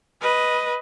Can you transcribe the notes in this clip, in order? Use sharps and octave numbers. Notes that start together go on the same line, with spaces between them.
B4 D#5